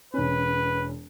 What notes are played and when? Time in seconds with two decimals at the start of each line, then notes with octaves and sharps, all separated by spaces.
0.14 E1 C#4 B4